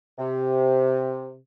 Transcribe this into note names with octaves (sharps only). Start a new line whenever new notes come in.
C3